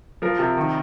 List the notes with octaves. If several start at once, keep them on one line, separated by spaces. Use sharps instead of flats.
F3 A#4
C3
D#3